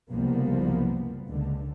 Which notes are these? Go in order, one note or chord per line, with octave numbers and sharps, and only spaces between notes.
F#1 C2 F3 G3 A#3 B3
C#2 D3